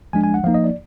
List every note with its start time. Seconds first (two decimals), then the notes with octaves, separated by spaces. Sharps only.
0.13 F3 G#3 D4 G#5
0.24 G#5
0.34 F#5
0.44 F3 A#3 D#4 F5
0.54 D#5
0.64 D5